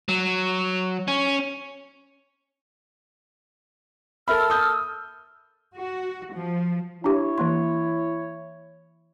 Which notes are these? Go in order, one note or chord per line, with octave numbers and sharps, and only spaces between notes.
F#3
C#4
A4 A#4 E5 B5 E6 F6
D#6 G6
F#4
F3
D4 E4 G4 C#5
E3 A#3 C6